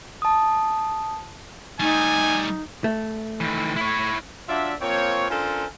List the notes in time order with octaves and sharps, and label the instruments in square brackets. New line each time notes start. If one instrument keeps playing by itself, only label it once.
[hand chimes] A5 D#6
[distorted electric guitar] G3 A3 [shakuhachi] D#4 [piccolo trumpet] G#5
[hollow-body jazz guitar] A3
[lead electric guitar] D#3 E3
E4 C#5
[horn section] F#3 D4 F4 D5 E5
F3 A#3 C4 C#5
C#4 D4 F4 A4 A#4 C5